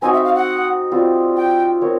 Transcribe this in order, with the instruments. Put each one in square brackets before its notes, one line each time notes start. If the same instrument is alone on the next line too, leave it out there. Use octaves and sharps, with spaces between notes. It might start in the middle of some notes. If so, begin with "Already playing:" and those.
[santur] C4 D#4 F#4 [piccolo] G#5
[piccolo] E5
F5
F#5
[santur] G3 C4 F4
[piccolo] G5
[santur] C4 F4 A#4 C#5